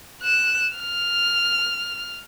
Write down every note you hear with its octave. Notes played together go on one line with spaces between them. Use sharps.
F#6 E7
F6